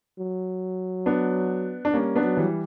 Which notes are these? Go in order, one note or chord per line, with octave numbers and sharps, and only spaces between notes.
F#3
B3 D4
D4
G3 A#3 C#4
B3 D4
F#3
E3 G3